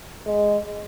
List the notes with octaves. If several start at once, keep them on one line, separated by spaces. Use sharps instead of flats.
G#3